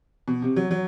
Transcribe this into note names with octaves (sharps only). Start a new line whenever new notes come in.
B2
C3
F#3
F#3